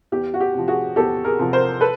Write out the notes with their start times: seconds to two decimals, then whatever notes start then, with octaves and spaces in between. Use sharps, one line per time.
0.12 E2 G4
0.34 F#4
0.40 G4
0.54 C3 F3
0.68 F#4 G#4
0.96 E2 G4 A4
1.24 G#4 A#4
1.39 C3 F3
1.53 A#4 C5
1.81 A4 B4